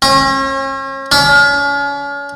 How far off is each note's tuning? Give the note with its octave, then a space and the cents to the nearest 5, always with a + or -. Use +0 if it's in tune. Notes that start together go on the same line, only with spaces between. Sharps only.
C#4 -40
C#4 +40